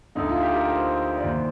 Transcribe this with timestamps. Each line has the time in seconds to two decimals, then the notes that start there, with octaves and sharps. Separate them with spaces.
0.15 D2 D3 D#4
0.29 F4
0.42 G4
0.56 A#4
0.69 C5
1.17 D5
1.23 D#2 D#3 C5